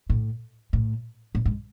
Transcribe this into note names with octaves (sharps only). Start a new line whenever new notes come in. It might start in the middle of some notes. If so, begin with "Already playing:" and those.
A2
A2
A2
G#2